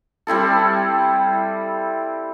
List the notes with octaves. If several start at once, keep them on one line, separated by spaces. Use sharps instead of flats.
G3 C4 E4 A4